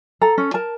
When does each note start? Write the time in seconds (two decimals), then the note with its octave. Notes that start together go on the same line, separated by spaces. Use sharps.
0.21 A4 A#5
0.38 C#4
0.54 A#4 A5